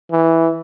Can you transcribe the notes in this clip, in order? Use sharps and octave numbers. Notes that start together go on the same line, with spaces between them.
E3